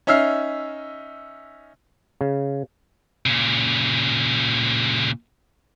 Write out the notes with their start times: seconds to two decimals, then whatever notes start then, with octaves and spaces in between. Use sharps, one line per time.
0.07 C#4 D#4 E5 E6 F6 C7
2.21 C#3
3.26 A#2 C#3